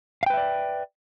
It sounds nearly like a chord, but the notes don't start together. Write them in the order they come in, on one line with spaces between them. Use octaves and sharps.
F5 G5 B4 E5 D5